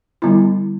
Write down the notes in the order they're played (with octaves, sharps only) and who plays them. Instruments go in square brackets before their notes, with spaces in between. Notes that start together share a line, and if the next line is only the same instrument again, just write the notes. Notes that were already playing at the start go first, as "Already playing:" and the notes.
[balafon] D3 G3 B3 E4